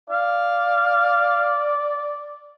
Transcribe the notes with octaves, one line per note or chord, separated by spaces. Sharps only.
D5 F5